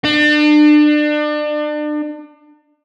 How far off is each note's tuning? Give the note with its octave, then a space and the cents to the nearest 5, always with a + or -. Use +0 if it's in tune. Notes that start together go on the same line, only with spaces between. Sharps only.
D4 +35